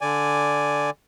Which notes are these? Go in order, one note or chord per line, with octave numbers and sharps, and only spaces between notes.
D3 D5 G#5